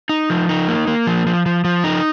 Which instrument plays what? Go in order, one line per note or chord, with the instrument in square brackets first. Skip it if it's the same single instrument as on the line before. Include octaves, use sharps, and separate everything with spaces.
[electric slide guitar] D#4
F3
D#4
A#3
A#3
F3
F3
F3
F3
D#4